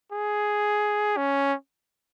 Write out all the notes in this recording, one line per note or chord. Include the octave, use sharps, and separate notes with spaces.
G#4
C#4